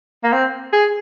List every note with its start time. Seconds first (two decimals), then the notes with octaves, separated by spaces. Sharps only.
0.24 A#3
0.32 C4
0.73 G#4